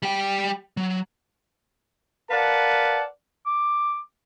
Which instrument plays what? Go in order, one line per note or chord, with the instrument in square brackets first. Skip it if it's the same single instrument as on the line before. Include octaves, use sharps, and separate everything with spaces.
[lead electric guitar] G3 G5
F#3
[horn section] A#4 B4 D5 F5 F#5 A5
[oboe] D6